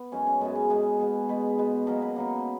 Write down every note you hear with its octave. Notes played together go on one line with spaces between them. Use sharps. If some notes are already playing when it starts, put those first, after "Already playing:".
Already playing: B3
F#2 C#3 G#3 C#4
C#4
F#2 C#3 G#3 B3
C#4
B2 G#3 B3 G#4
B2 G#3 B3
B2 G#3 B3 B4
B2 G#3 B3
B2 F#3 A#3 A#4
B4
B2 F#3 A#3